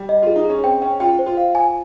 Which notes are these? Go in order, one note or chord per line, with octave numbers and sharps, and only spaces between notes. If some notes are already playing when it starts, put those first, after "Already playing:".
Already playing: G3
D#5
F4 G#4
D#4
C#4 G#4
C4 G5
C#4 G5
F4 G5
C5
F4
F5
G#5